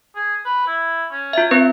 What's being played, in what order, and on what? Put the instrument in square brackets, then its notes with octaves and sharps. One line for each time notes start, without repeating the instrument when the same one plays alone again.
[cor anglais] G#4
B4
E4
C#4
[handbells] F4 E5
[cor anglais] F#3 [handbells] C4 B4